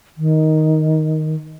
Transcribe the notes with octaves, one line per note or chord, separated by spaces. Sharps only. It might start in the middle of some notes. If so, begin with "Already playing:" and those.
D#3